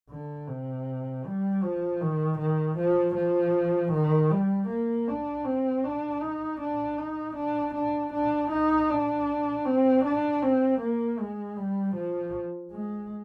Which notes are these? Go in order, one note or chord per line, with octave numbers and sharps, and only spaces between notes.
D3
C3
G3
F3
D#3
D#3
F3
F3
D#3
G3
A#3
D4
C4
D4
D#4
D4
D#4
D4
D4
D4
D#4
D4
C4
D4
C4
A#3
G#3
G3
F3
G#3